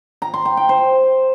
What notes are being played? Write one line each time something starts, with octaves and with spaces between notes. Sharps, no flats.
A#5
C6
G5
G5
C5